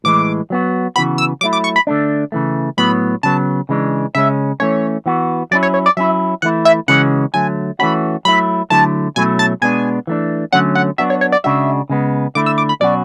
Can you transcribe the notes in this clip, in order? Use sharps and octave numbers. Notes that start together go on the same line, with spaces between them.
A2 E3 G#3 D6
F#3 B3 F#4
C#3 E3 B3 F#4 B5
E6
F#3 A3 E4 D6
D6
C#6
B5
D3 A3 D4
C#3 E3 A3
A2 F#3 B3 B5
C#3 F#3 B3 A5
C#3 E3 G#3 D4
C#3 G#3 C#4 E5
E3 A3 C#4 C#5
E3 B3 F#4
F#3 C#4 E4 D5
C#5
C#5
D5
F#3 C#4 E4 E5
E3 A3 E4 F#5
E5
C#3 E3 G#3 C#4 F#4 F#5
D3 F#3 A3 G#5
E3 A3 C#4 F#4 B5
F#3 A3 E4 B5
D3 F#3 A3 E4 A5
B2 F#3 A3 C#4 E4 G#5
A5
B2 G#3 B3 D4 G#5
E3 A3 D4
D3 F#3 A3 C#4 F#5
F#5
F#3 B3 D4 F#4 E5
C#5
C#5
D5
C#3 G#3 D4 F#4 E5
C#3 G#3 B3
D3 A3 E4 D6
E6
D6
B5
B2 F#3 C#4 F#4 D5